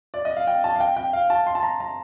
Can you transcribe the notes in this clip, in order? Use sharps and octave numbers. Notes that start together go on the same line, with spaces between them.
D5
D#5
F5
G5
A5
F5
G5
G5
F5
A5
C6
A5
A#5
A#5